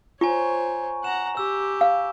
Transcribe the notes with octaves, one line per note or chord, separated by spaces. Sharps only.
F4 C5 C#5 G#5 A#5 C#6
F#5 A#5 E7
G4 E6
F5